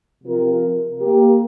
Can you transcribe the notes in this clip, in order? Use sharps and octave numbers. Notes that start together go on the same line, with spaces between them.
C3 F3 C4 F4 A#4
A#3 G4 A#4